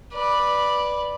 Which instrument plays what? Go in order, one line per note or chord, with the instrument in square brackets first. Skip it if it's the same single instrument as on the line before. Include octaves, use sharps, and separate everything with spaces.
[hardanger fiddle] B4 D5